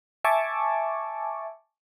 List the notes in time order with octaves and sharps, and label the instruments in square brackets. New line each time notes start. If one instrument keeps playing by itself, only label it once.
[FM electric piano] E5 G#5 A5 C#6 D6